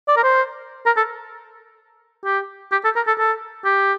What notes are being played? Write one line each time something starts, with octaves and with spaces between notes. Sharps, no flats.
D5
A#4
C5
A#4
A4
G4
G4
A4
A#4
A4
A4
G4